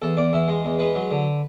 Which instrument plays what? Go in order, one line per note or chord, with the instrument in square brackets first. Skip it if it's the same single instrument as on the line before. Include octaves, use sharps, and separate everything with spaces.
[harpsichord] E2 A4
E2 D5
E2 E4
G#3
E2
G#3 B4
F#3
D3